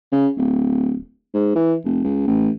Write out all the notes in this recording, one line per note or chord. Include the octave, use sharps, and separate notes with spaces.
C#3
D1
G#2
E3
F1
C#2
A1